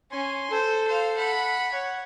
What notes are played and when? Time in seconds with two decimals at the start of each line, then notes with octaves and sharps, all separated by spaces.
0.12 C#4 G#5 C6
0.51 A4 C5
0.88 C5 F5
1.17 F#5 B5
1.72 C#5 F#5